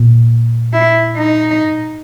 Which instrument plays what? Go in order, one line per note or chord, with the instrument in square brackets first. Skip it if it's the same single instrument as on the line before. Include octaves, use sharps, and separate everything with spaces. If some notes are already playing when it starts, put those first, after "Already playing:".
Already playing: [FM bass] A#2
[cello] E4
D#4
[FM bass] G#2
A#2